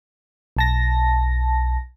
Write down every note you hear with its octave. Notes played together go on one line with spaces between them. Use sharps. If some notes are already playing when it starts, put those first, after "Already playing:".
B1 A5 A#6